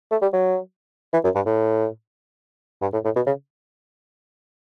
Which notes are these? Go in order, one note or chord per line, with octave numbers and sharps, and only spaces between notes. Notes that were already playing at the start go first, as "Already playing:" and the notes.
A3
G3
F#3
E3
F#2
G2
A2
G2
A2
A2
B2
C#3